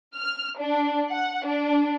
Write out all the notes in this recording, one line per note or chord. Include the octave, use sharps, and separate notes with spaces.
F6
D4
F#5
D4